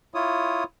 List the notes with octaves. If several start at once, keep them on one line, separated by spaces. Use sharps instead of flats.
E4 F4 C#5 D#6